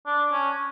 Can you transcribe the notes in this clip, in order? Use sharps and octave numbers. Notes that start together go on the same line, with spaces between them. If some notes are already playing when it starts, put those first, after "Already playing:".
D4
C#4